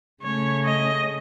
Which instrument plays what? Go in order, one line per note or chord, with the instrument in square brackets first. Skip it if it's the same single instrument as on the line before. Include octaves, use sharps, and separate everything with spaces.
[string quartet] C#3 A3 C#4 [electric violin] C#5
[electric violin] D#5